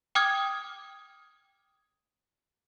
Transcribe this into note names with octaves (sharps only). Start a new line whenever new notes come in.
G5 D6 D#6 F6 G#6